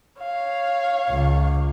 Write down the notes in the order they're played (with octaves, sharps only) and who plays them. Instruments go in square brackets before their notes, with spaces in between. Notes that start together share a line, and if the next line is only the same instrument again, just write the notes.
[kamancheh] C#5 F5
[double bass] C#2